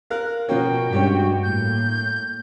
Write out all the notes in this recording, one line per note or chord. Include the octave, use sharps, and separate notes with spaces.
A#4 F5 F#6
B2 F3 A#3 C#4 F#4 G5
G2 G#3 C#4 F#4 G4
A2 A#3 G6